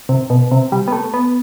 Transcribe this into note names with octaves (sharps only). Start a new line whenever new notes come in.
C3
B2
C3
G3
B3
A3
B3